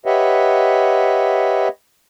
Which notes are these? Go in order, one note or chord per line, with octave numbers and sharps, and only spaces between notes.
G4 B4 C#5 D#5 E5 F#5